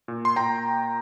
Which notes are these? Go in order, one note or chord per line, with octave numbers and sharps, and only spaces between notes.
A#2
C6
A#2 G5 A#5